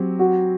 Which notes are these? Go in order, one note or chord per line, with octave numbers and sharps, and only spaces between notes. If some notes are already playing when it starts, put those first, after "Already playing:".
Already playing: F#3 C4 G4
F#4